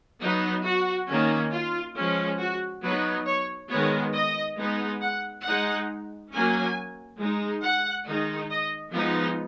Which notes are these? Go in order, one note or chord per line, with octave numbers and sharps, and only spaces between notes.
F#3 B3 D#4
F#4
D#3 A#3 C#4
F4
F3 G#3 C#4
F#4
F#3 B3 D#4 B4
C#5
D#3 G#3 B3 C#5
D#5
G#3 B3 D#4
F#5
G#3 D#4 F#5
F#3 A#3 C#4 G#5
G#3 D#4
F#5
D#3 G#3 D#4
D#5
F3 G#3 B3 D#4